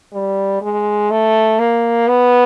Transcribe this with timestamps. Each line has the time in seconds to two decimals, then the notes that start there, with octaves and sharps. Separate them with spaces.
0.13 G3
0.62 G#3
1.11 A3
1.59 A#3
2.08 B3